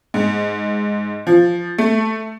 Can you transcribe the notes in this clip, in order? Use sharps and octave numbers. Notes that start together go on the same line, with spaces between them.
G#2
F3
A3